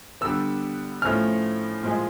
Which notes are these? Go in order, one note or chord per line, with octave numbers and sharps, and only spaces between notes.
D3 G3 B3 E6
A2 F3 A3 C#4 F6
A#2 F3 G#3